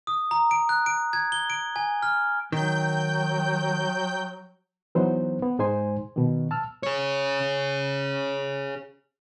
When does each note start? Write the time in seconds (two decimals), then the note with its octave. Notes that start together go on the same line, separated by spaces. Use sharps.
0.07 D#6
0.31 A#5
0.51 D7
0.69 F#6
0.86 D7
1.13 G#6
1.32 G7
1.50 D7
1.76 G#5
2.02 F6
2.52 D#3 F#3 G5 G6
4.95 E3 F#3 B3 D#4 C5
5.43 B3
5.59 G#2 G#3 D#4 C5 G#5 C6
6.16 B2 D#3
6.51 A5 E6 F6
6.83 G#4 C#5